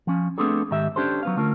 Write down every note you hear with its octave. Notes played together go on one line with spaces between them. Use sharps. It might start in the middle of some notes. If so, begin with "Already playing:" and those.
F3 C#4
A3 B3 C4 D4 G#4 A4
G#2 D#3 G4 E5
C#4 D4 G4 A4 C5
F#3 B3 F5
D3 A3 C#4 F4 A#4